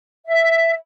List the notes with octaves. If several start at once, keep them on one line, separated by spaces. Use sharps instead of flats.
E5